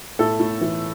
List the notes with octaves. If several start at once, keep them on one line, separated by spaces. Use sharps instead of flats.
A2 A4
A2
E3